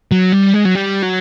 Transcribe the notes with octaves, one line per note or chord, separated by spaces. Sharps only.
F#3
G3
G#3
F#3
G3
F#3